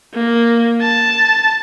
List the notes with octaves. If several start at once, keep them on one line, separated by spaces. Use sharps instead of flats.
A#3
A5